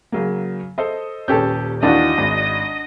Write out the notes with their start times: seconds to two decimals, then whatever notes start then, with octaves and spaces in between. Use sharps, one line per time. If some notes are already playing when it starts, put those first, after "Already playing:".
0.12 C#3 F#3 A#3
0.78 A4 C5 D#5
1.28 D#1 C#4 G4 A4 B4 G6
1.83 D#2 E3 D4 F#4 D#5 A5
2.18 G#1